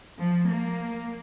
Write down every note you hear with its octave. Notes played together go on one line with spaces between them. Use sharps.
F3
A#3